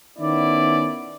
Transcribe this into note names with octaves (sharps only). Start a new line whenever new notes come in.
D#3 B3 C#4 E4 D5